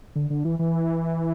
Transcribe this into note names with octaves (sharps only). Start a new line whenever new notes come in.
D3
D3
E3
E3